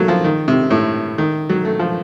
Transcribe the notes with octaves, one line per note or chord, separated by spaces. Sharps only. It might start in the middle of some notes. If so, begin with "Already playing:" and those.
Already playing: F#3 A3 A#3
F3
D#3
C3
A2
D#3
F#3
A3
F3